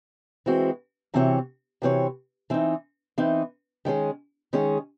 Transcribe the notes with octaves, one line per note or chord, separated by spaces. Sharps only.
E3 G#3 C4 F#4
C3 E3 C4 F#4 C#5
C3 E3 C4 F#4 C#5
E3 C4 D#4
E3 C4 D#4
D#3 G#3 C#4 G#4
D#3 G#3 C#4 G#4